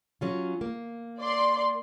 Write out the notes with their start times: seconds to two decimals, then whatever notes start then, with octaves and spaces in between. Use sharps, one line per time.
0.21 F#3 C#4 F4
0.61 A#3
1.20 D5 C6